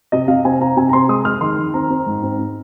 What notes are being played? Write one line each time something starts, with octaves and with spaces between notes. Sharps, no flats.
C3 D#5
C3 F5
C4 G#5
C4 A#5
C3 G#5
A#5
C4 C6
G#3 D#6
G#3 F6
D#3 C6
D#3
C4 A#5
C4
G#2
C4
C4